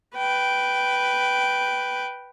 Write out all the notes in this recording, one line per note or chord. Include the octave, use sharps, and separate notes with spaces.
B4 G5